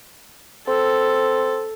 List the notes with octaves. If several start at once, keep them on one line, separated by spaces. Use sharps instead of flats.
C4 A4